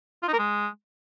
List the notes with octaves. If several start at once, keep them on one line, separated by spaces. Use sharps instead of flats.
F4
D#4
A#4
G#3